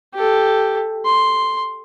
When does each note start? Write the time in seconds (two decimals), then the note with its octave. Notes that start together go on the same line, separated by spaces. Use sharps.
0.14 G4 A4
1.05 C6